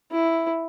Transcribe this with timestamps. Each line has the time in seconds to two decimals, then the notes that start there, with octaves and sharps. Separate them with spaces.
0.12 E4